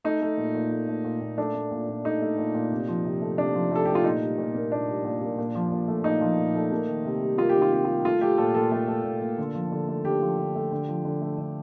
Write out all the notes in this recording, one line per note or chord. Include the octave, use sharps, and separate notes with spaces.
A3 D#4
A3
A#2
A#2
A3
A3
A#2
A#2
A3 D4
A3
A#2
A#2
A3 D#4
A3
A#2
A#2
C3
F3
C3
A3
C3 D4
F3
C3 A4
A3 G4
F4
A#2 D#4
G3
A#2
A#3
A#2 D4
G3
A#2
A#3
A#2
F3
A#2
A3
A#2 D#4
F3
A#2
A3
A#3
D#3
C3
G3
A#3 F4
G4
D#3
F4
C3 G4
G3 F4
A3 F4
A3 G4
A#2 A4
A#2 A4
A3
A3
A#2
A#2
D3
F3
D3
A3
D3 G4
F3
D3
A3
D3
F3
D3
A3
D3